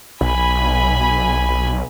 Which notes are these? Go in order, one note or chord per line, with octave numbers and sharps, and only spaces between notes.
B1 G#5 B5